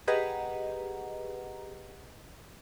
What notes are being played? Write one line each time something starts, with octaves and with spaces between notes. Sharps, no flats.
G4 G#4 B4 D#5 F#5 A#5